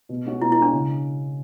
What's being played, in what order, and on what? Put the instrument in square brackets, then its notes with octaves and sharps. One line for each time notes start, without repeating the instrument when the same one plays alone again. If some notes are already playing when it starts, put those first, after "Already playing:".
[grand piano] B2
G#3 C#4 F#4
[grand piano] B2 [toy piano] E4
[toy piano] E4
[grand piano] G#3 C#4 F#4 [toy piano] D4
[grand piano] C#3